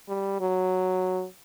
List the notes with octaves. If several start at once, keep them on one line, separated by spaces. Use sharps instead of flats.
G3
F#3